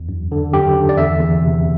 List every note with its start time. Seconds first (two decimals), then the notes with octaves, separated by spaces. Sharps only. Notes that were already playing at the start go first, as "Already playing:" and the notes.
Already playing: E2
0.09 F#2
0.32 D3
0.53 F#2 G4
0.76 D3
0.89 D5
0.97 E2 E5
1.19 E2
1.42 C3